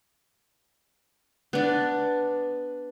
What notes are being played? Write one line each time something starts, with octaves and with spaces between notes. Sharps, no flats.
B3 D4